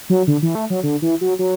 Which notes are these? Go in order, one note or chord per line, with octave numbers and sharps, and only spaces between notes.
F#3
D3
E3
A3
F#3
D3
E3
F#3
F#3